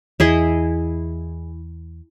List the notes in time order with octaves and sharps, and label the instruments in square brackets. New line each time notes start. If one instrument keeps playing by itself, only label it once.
[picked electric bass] E2 [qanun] E4 G#4 D#5